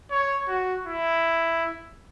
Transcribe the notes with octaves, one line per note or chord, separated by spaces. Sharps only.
C#5
F#4
E4